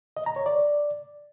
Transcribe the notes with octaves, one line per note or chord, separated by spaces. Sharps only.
D#5
A#5
C#5
D5